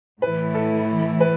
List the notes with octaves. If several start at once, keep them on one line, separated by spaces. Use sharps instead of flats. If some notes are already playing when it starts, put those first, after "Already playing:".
A2 E3 A3 E4 B4
A4
B4